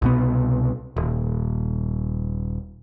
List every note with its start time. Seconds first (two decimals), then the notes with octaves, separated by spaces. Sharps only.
0.02 C2 B2 B3
0.97 D#1